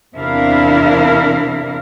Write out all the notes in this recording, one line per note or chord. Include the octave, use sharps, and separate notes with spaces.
E2 C3 D4 E4 A#4 F5